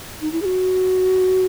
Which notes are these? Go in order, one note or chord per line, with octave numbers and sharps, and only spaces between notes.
D#4
E4
G#4
F#4